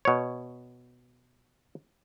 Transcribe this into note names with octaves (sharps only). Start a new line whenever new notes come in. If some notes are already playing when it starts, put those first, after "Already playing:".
B2 C#5